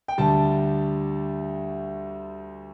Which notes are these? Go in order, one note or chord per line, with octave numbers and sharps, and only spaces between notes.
G5
D2 D3 G3 A5